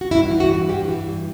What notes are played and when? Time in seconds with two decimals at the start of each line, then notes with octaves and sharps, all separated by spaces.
0.01 F#4
0.11 G2 E4
0.31 E3
0.40 F#4
0.50 G2
0.69 G2 G4
0.88 E3
1.07 G2